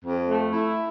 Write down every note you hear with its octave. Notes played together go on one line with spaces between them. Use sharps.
F2
A3
E4